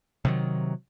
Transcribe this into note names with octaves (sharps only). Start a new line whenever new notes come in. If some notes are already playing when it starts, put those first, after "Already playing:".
C3 D#3 F#3